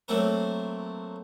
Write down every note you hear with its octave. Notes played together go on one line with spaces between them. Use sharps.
F#3 A3 A#3 C4 A4 A#4